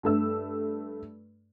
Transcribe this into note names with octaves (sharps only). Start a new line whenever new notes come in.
G2 A3 E6